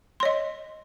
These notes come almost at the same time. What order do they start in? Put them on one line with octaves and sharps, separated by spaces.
C6 C#5 D#5